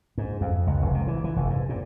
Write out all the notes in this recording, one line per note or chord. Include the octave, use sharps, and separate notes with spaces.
G#2
F2
C#2
F1
C3
E3
E3
F1
G#2
A#2